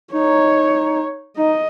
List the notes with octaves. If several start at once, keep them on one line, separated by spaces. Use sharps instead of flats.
D#4 C#5
D#4 D#5